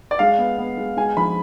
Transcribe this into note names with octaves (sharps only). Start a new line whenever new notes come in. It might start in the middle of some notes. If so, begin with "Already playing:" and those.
D5
G#3 F5
B3
B3
G#3
G#3 G#5
F3 B5